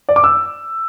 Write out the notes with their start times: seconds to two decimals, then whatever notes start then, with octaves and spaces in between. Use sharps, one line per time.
0.09 D5
0.16 D6
0.24 E6